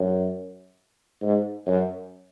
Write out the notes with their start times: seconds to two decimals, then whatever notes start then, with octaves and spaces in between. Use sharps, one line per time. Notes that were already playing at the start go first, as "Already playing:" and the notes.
Already playing: F#2
1.22 G#2
1.67 F#2